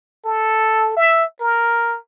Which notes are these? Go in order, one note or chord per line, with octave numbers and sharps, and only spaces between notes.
A4
E5
A#4